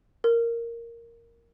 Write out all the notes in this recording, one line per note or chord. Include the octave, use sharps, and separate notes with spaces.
A#4